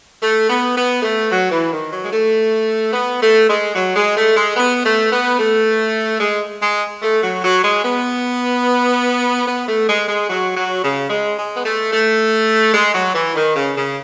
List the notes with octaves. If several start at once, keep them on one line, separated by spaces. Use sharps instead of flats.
A3
B3
B3
A3
F#3
E3
D#3
F#3
G#3
A3
B3
A3
G#3
F#3
G#3
A3
G#3
B3
A3
B3
A3
G#3
G#3
A3
F#3
F#3
G#3
B3
B3
A3
G#3
G#3
F#3
F#3
C#3
G#3
G#3
B3
A3
A3
G#3
F#3
E3
D#3
C#3
C#3